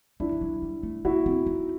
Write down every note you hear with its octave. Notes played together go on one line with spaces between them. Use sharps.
G3 D4 E4
G3
F#3
G3
A3
A#3 E4 F#4
C4
D#4